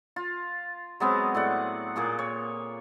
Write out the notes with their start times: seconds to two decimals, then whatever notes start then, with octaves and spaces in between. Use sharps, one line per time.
0.16 F4
1.00 F#3 G#3 B3 C4
1.35 A2 D5 F#5
1.96 A#2 A#3 G#4 D6
2.19 C#5